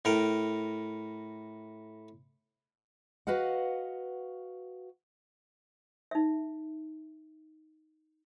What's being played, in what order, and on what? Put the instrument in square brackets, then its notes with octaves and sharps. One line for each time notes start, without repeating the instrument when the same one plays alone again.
[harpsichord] A2 A#4 G5 A#5
[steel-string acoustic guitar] F#4 B4 D#5 F5 F#5
[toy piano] D#4 E5